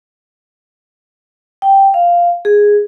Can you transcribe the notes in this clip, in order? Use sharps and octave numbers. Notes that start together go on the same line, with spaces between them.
G5
F5
G#4